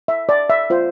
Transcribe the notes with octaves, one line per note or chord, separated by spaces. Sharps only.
E5
D5
E5
F4 C5